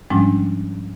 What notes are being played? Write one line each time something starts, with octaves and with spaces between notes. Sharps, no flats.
G#2 F3 G3 G#3 C#4 D4